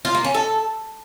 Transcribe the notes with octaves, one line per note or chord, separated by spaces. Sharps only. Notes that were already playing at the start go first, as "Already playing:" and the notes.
F4
A#3
C#4
A4